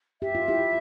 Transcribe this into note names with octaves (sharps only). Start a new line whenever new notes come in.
G4 E5
F4
E4 G4